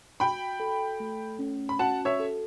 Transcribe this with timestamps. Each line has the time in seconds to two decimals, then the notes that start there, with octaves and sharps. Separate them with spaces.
0.20 F#4 G5 B5
0.60 A4
1.00 A3
1.39 C#4
1.69 B5
1.79 F#4 F#5 A5
2.05 C#5 E5
2.20 A4